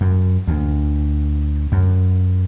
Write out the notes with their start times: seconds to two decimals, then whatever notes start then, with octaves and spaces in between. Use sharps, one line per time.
0.01 F#2
0.47 D2
1.72 F#2